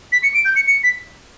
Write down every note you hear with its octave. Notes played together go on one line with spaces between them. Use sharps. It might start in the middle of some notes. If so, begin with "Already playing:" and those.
B6
C#7
D7
G6
C#7
C#7
B6